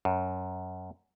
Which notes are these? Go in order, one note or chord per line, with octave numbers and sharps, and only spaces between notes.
F#2